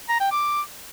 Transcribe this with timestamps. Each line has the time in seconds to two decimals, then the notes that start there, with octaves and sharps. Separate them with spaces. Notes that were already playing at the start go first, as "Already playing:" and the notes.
0.09 A#5
0.20 G5
0.31 D6